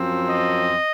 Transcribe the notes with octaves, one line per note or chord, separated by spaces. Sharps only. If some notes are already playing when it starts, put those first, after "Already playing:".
Already playing: F#2 F3 C4
D#5